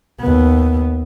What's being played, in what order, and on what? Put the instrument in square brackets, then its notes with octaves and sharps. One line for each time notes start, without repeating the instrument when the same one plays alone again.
[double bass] D#2 B3